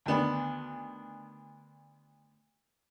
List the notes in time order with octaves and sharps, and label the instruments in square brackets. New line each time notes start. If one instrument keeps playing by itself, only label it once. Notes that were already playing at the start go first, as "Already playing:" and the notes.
[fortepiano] D2 D#3 B3 D4